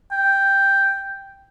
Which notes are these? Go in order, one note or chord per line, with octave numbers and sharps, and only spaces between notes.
G5